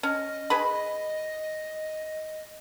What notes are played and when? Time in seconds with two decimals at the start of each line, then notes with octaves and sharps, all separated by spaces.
0.03 C#4 D#5
0.50 G#4 B4 B5